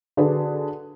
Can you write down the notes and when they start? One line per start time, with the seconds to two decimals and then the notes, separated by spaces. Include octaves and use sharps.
0.17 D3 D4 F#4 G#4 A4 B4